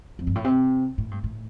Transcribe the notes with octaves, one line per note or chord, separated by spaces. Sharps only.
F2
G2
A2
C3
A2
G2
A2